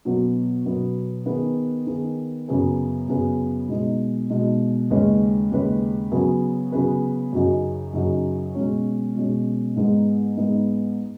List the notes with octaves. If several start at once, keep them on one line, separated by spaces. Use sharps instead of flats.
B2 F#3 B3
B2 F#3 B3
D#3 B3 G#4 B4
D#3 B3 G#4 B4
F#2 C#3 B3 G#4 B4
F#2 C#3 B3 G#4 B4
B2 G#3 D#4
B2 G#3 D#4
D#2 C#3 G#3 C#4 B4
D#2 C#3 G#3 C#4 B4
C#3 F#3 B3 G#4 B4
C#3 F#3 B3 G#4 B4
F#2 C#3 F#3 D#4 G#4
F#2 C#3 F#3 D#4 G#4
B2 G#3 C#4
B2 G#3 C#4
G#2 G#3 B3 D#4
G#2 G#3 B3 D#4